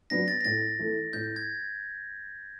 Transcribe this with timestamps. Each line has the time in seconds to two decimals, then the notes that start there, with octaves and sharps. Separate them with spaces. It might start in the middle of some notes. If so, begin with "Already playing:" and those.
0.10 F#3 B3 D4 A#6
0.28 A6
0.41 A#6
0.44 A2 A6
0.79 E3 A3
1.13 A2 G6
1.36 G#6